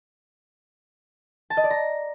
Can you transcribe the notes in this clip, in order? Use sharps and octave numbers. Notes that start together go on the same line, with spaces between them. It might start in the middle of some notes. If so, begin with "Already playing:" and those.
A5
D#5
D5
A#5